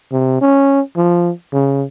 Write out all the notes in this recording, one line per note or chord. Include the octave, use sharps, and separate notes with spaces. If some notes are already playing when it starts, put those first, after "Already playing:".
C3
C#4
F3
C#3